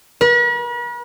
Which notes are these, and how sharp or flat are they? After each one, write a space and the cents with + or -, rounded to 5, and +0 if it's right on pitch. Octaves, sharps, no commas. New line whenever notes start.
B4 -45